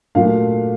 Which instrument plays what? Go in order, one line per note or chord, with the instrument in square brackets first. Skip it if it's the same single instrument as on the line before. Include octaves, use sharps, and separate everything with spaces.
[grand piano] A#2 F#3 A3 D4 F5